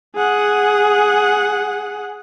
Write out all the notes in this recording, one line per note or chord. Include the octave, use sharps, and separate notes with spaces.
G#4 F#5